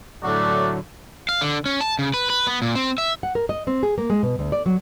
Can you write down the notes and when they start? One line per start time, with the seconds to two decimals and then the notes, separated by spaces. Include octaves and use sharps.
0.23 A2 D3 F#3 A3 D4 F#4
1.29 F5
1.41 D3
1.66 C#4
1.81 A5
1.99 C#3
2.14 B4
2.30 B4
2.47 B3
2.62 A#2
2.75 C4
2.98 E5
3.23 F#5
3.35 A#4
3.49 D#5
3.67 C4
3.83 G#4
3.98 A#3
4.10 G#3
4.23 B2
4.39 D2
4.52 D5
4.66 F#3